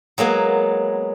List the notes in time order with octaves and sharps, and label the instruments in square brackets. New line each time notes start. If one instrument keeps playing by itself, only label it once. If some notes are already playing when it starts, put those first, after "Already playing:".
[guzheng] F#3 G#3 A#3 B3